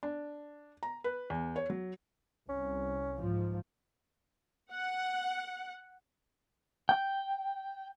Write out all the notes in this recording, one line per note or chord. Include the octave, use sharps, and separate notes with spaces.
D4
A#5
B4
E2
C#5
F#3
C2 C#4
G#2 F3
F#5
G5